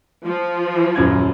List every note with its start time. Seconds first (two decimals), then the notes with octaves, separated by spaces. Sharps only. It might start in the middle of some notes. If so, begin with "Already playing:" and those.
0.24 F3
0.96 D#1 F#2 G#6